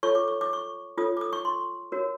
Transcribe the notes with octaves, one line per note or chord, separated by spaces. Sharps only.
F4 A4 C#5 C#6
D6
C#6
D6
C#6
F4 A4 C#5 D#6
D6
D#6
C#6
C6
F#4 A#4 C#5